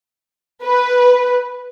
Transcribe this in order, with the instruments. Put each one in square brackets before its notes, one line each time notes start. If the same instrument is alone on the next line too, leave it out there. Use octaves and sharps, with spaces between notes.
[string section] B4